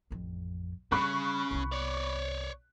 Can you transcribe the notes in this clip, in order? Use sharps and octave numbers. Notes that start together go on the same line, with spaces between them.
A1 F2
C#3 G3 B5 C#6 F#6
C2 B3
C#5 D5